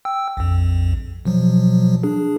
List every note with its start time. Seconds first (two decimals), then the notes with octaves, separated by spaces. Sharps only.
0.05 G5 E6
0.37 A#1 F2
1.25 B2 F3 F#3
2.03 D4 G#4